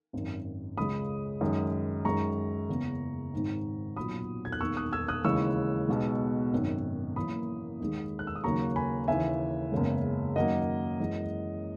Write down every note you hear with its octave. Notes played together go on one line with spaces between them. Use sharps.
G#1 F#2 D#3
C#2 C#3 G#3 B5 D#6
F#2 D#3 G#3
F#2 D#3 G#3 A#5 C#6
F#1 E2 C#3
G#1 G#2 D#3
B1 A#2 F#3 B5 D#6
G#6
F#6
E1 D#2 D#3 C#6 E6
D#6 F#6
E6 G#6
D#6 F#6
D#2 C#3 E3 G#3 C#6 E6
B1 B2 G#3
G#1 F#2 D#3
F#1 F#2 E3 A#3 B5 D#6
D#2 D#3 G#3
F#6
E6
D#6
D#2 C#3 F#3 A#3 A#5 C#6
G#5 B5
D#2 C#3 E3 E5 G#5
F#1 E2 C#3 G#3
F#2 D#3 F#3 A#3 D#5 F#5
F#2 E3 G#3